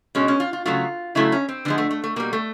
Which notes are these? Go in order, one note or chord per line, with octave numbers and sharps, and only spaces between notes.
B2 G#3 C#4
C#4
F4
F4
C#3 F#3 A3 F4
C#3 F#3 A3 E4
C#4
C4
D3 F3 G#3 B3
A3
A3
A3
B2 G3 A#3
A3